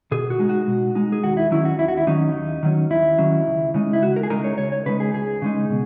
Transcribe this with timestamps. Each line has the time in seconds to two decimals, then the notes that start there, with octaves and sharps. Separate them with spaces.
0.12 B2 G#4
0.30 F#4
0.39 G#3 D#4
0.49 F#4
0.68 B2
0.95 G#3 D#4
1.12 G#4
1.23 D#2 F#4
1.37 E4
1.51 D#3 F#3 C#4 E4
1.65 F#4
1.79 D#2 E4
1.88 F#4
1.97 E4
2.07 D#3 F#3 C#4 D#4
2.35 D#2
2.63 D#3 F#3 C#4
2.91 D#2 E4
3.18 D#3 F#3 C#4
3.47 C#2
3.74 C#3 G#3 D#4
3.93 E4
4.02 C#2 F#4
4.16 A#4
4.23 G#4
4.30 C#3 G#3 D#4 A#4
4.44 C#5
4.58 C#2 C#5
4.72 C#5
4.86 C#3 G#3 D#4 B4
5.00 G#4
5.14 C#2 G#4
5.42 C#3 G#3 D#4
5.70 B2